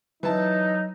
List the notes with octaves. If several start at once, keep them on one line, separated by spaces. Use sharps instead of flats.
E3 F#3 D#4 A5